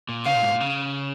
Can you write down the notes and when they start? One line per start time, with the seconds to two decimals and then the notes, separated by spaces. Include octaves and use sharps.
0.09 A#2
0.26 C#3 F5
0.35 A#2
0.42 G#2
0.51 A#2
0.60 C#3